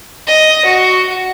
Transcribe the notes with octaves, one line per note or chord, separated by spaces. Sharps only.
D#5
F#4